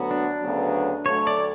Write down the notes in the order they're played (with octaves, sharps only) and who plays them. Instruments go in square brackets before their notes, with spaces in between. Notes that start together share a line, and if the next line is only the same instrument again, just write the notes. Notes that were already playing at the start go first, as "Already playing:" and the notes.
Already playing: [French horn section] D2 D3 F#3 B3 F#4
[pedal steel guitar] D4
[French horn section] D2 C#3 F#3 B3
[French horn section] D2 D3 F#3 A3 [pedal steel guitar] C#5
[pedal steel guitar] D5